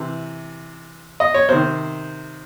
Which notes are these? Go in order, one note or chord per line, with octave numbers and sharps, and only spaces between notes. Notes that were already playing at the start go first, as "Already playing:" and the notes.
Already playing: C3 E3
D#5
C#5
C3 D#3 C5